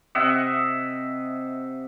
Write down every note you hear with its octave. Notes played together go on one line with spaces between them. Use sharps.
C3 D#5 E5 F#5